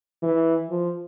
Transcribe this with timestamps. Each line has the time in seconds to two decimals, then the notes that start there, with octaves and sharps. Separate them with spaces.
0.23 E3
0.70 F3